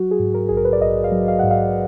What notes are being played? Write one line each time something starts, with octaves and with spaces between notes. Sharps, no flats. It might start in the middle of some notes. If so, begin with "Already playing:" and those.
Already playing: F#3 F#4
G#4
G#2
A#4
A#1 G#4
A#4
B4
D5
A#1 D#5
F5
F#3
F5
G#2 F#5
F5